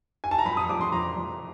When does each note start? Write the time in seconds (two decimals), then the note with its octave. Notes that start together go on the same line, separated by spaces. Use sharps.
0.24 G#5
0.31 A5
0.38 A#5
0.45 F2 B5
0.57 D#6
0.69 F2 D6
0.81 C6
0.92 F2 A#5
1.16 F2